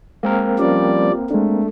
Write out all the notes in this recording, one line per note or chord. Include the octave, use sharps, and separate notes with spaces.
G#3 A#3 C4 A#4
F3 G3 C#4 D5
G#3 A3 D4